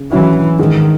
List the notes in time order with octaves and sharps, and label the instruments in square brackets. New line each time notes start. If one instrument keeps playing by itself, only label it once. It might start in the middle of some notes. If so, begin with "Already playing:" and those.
Already playing: [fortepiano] C#3
[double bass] E3 [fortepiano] F#3 C#4 E4
[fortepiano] G#2 [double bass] D#3